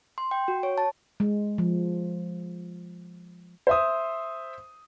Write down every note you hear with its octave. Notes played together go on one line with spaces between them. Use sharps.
C6
G5
F#4
C#5
A5
G#3
F3
C5 E5 D#6